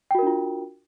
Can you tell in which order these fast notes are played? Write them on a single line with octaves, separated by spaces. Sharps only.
G5 F#4 A#4 D4 F4